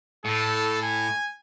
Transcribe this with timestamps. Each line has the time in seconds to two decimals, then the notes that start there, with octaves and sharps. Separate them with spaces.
0.25 A2 A4
0.82 G#5